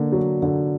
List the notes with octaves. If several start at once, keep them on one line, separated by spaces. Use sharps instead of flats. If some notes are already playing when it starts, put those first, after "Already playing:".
Already playing: D3 A#3
F#3
D3